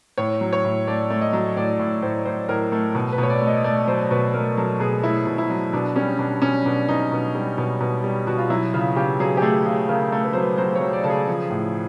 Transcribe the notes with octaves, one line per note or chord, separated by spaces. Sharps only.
A2 C#5
F#3
C#5
A2
A3 D5
A3
D#5
F#3
A2 D5
A2
A2 C5
A2 C5
A2 A#4
A3
B2
B4
B2 C#5
D5
A3
D#5
A3 D5
F#3 C5
B2 B4
A3 A#4
F#3 A4
B2 G#4
A3 E4
B2
E4
F#3
B2 D4
G3 C#4
B2 D4
B2 C#4
B2 D4
B2 D#4
B2
G3
B2
B2
G3
B2 F#4
F4
F#3 E4
C#3 F4
C#3 G4
F#3 G#4
G4
A3 G#4
C#3 G#4
C#3 A#4
A3
B4
F#3 C5
B4
F#3 C5
C#5
F#3
D5
C#3 A4
G#4
F3
A2